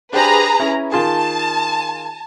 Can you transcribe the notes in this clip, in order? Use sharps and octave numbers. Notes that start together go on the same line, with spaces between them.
D4 G4 G#4 B4 C5 A#5
C#4 E4
D#3 F4 G#4 A5